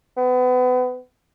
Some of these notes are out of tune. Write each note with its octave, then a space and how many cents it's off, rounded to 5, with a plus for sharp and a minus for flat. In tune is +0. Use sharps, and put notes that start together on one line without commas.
B3 +30